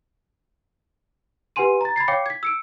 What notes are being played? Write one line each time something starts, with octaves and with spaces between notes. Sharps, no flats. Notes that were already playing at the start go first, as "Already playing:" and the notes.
G4 B4 F#5 G#5 C6 D#7
A#5 A6
B5 G#6 A6 C7
C#5 F5 G5 D6 C7 C#7
G#6 B6
E6 C#7 D7